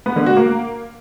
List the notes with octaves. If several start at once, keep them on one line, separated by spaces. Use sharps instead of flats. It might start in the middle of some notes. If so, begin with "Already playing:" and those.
B3
D3
F#4
A#3